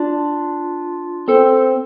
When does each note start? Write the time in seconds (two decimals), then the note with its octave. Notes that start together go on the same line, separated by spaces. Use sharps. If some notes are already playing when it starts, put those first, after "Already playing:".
Already playing: D4 F4
1.28 C4 A4